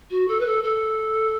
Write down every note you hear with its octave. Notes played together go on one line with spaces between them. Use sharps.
F#4
A4
B4
A4
A4